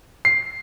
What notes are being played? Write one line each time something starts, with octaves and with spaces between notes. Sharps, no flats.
C7